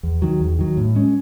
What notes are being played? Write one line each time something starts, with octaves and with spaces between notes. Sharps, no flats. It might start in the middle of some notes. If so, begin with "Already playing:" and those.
E2
D#3 F#3
E2
D#3 F#3
A2
G#3 C#4